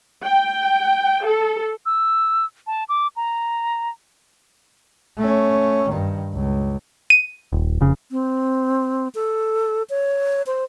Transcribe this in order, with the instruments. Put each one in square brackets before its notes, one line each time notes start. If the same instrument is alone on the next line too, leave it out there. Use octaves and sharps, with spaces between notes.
[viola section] G5
A4
[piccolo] E6
A5
D6
A#5
[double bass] A3 C#4
G2 D#3
C#2
[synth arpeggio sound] D#7
[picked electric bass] D#1
F1 C#3
[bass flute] C4
A4
C#5
C5